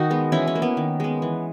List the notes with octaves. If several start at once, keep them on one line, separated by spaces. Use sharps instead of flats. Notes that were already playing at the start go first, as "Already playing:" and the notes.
Already playing: D#3 D#4 F#4
G#3 B3
E3 C#4 E4
C#4
A#3
B3
D#3
G#3 B3
E3